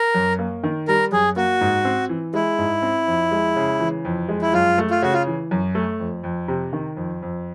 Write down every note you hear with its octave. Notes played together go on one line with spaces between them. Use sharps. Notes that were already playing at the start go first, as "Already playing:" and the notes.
Already playing: A#4
F#2
A#3
D#3
G3 A#4
F#2 G#4
A#3 F#4
G#2
C4
E3
G#3 E4
G#2
C4
F2
G#3
C#3
E3
F2
G#3
E4
F#2 F4
A3
F4
C#3 F#4
F4
E3
F#2
A3
F2
F2
C3
D#3
F2
F2